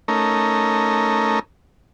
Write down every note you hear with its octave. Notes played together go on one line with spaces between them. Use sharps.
A3 C#4 D#4 A#4